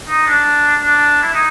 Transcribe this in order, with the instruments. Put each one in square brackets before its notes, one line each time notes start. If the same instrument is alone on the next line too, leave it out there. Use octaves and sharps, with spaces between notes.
[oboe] D#4
D4
D4
E4
D#4